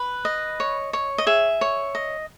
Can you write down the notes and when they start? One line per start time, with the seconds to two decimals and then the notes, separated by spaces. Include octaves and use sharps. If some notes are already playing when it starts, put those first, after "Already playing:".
Already playing: B4
0.25 D#5
0.60 C#5
0.93 C#5
1.18 D#5
1.27 G#4 E5
1.61 C#5
1.95 D#5